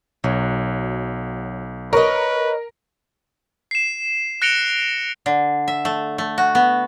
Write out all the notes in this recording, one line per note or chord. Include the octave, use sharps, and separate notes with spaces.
B1 F#3
A#4 B4 C#5 D#5
C7 E7
F#6 A#6 C#7 D7 F7 G7
D3
E5
A3
A3
F#4
B3